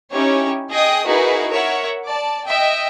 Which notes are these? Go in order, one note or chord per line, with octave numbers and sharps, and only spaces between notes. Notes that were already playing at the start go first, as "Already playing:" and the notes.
C#4 D#4 E4 G4 C#5
G#4 D#5 G5 D#6
D#4 E4 F#4 G#4 A#4 B4
A#4 C#5 E5 F#5
D5 A5
D#5 E5 G5